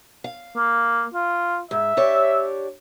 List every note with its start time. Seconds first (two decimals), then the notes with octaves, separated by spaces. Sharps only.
0.24 F5
0.56 A#3
1.14 F4
1.71 G#2 E5
1.97 D4 G4 C#5